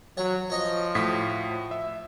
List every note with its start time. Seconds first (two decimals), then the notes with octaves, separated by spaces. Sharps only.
0.17 F#3 C#5 F#5
0.50 F3 C#5 D#5 C#6
0.95 A2 F#4 D#6 B6
1.71 E5